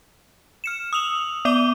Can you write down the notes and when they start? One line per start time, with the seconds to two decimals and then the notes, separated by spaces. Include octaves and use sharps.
0.64 F6 C#7 E7
0.93 D#6 E6 F7 F#7
1.45 B3 D5 D6 D#7 G7